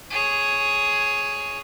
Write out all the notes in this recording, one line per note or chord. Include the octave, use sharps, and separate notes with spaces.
G#4 C#5